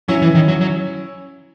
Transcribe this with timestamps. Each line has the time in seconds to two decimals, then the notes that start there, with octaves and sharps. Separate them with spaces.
0.08 F#3 C#4 E4
0.22 E3
0.35 D#3
0.48 F#3
0.61 F#3